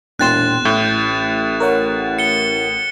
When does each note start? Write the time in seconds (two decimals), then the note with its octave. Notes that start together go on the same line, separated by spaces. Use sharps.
0.19 E1 A#2 G5 C6 F#6 A6 E7
0.65 A1 A2 G6
1.60 A#4 C#5 F#5
2.19 C#7 G7